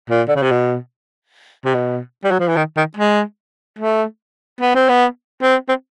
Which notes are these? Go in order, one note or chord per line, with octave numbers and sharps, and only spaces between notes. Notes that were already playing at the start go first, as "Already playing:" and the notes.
A#2
D3
C#3
C3
B2
C3
B2
G3
F#3
F3
E3
D#3
D#3
G#3
A3
B3
C4
B3
C4
C4